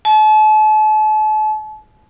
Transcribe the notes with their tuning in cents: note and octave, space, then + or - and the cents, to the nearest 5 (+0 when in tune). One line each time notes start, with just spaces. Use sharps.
A5 -40